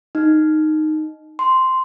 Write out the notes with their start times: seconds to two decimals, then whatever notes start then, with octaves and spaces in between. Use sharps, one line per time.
0.15 D#4
1.39 C6